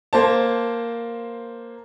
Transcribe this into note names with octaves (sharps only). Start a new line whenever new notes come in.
A#3 C5 A5